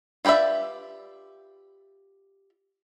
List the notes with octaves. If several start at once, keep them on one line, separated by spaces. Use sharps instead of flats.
F4 G4 B4 D5 E5